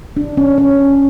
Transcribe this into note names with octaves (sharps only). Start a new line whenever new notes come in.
D4
C#4
C#4